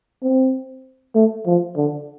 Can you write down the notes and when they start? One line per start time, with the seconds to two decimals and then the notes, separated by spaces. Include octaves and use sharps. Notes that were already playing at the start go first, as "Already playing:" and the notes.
0.23 C4
1.15 A3
1.46 F3
1.77 D3